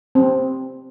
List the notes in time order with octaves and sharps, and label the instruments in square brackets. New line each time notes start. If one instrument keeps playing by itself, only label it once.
[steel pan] C4